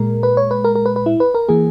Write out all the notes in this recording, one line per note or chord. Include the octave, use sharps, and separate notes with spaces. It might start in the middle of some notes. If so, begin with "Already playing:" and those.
Already playing: A#2 G#3 A#4
B4
C#5
B4
A#4
A#4
B4
B4
E4
B4
A#4
E3 A#3 G#4